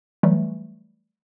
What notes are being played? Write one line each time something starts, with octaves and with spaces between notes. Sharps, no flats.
E3 F#3 G3 A3